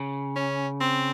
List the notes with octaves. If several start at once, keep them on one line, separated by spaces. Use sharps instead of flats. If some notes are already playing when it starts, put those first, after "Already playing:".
Already playing: C#3
C#4
C4